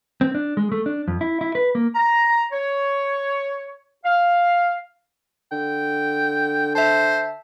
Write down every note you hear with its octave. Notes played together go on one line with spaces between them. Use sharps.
C4
D4
G#3
A3
D4
F2
E4
E4
B4
A#3
A#5
C#5
F5
D3 G5
C5 E5 A5